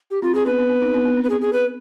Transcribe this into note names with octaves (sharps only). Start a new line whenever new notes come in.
G4
C4 F4
C4 G#4
B3 D4 B4
B3 D4
B3 D4
C4 D#4
B3 D4
B3 D4
C4
B4
G#4
G#4
B4